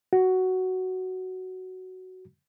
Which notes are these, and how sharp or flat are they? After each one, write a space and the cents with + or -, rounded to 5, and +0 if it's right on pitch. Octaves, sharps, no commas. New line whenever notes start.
F#4 +5